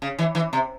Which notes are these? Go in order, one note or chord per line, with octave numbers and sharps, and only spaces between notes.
C#3
E3
E3
C3